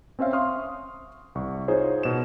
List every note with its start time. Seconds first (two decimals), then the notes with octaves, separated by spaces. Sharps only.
0.19 C4 C#4 C5 E5 F5
0.33 C6 C#6 D#6 F6
1.35 C2 C#6
1.68 D#4 F4 G#4 C5 C#5
2.03 B2 B3 E7